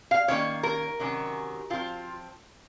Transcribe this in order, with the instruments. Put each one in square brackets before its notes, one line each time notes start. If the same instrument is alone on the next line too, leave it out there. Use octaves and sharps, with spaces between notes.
[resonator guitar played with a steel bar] F5
D#3 A#3 C#4 C#5
A#4
C3 D#3 F#3 C#4
F3 C4 F4